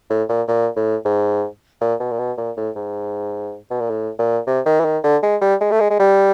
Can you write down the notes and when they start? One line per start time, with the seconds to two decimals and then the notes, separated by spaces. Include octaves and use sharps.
0.10 A2
0.29 A#2
0.48 A#2
0.76 A2
1.05 G#2
1.81 A#2
2.00 B2
2.11 A#2
2.19 B2
2.37 A#2
2.57 A2
2.76 G#2
3.70 B2
3.80 A#2
3.90 A2
4.19 A#2
4.47 C3
4.66 D#3
4.80 E3
4.85 D#3
5.04 D3
5.23 G#3
5.41 G3
5.61 G#3
5.71 A3
5.80 G#3
5.90 G#3
5.99 G3